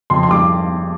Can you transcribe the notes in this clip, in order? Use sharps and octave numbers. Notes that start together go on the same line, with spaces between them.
F2 C6
C6
G3 D6